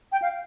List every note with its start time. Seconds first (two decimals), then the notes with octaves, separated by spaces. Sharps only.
0.12 G5
0.22 F5